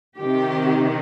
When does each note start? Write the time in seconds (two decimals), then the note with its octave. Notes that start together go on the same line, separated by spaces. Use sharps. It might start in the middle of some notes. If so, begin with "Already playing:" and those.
0.17 C3 D#3 G4